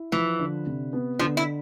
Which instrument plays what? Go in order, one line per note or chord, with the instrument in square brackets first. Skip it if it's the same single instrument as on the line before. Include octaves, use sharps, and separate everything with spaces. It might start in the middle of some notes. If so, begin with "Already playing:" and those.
Already playing: [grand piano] E4
[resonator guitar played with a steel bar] E3 [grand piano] F3
[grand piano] D3
C3
B3
[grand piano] D3 [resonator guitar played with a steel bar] F3
[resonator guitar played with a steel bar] E4